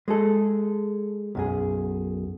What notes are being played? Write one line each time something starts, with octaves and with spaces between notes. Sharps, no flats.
G#3 G#4 A4
B1 F#2 G#4